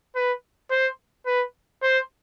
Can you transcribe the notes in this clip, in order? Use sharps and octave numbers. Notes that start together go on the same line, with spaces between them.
B4
C5
B4
C5